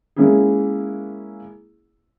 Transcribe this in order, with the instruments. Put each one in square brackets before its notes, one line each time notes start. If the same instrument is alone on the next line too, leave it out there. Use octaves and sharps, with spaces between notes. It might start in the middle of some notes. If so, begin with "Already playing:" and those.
[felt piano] G#3 A#3 C#4 E4 G#4